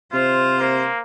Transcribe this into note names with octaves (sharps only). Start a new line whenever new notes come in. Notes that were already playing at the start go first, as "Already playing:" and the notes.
C3 F4 C5
A#3